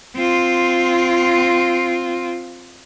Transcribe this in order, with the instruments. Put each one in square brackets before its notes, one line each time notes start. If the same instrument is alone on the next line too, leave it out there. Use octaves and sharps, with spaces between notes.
[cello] C4 F4